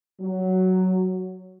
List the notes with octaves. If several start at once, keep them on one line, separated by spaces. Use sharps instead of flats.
F#3